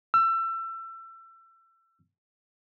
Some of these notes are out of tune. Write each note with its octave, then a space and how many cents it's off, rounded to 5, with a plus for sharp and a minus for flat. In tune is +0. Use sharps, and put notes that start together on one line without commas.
E6 +30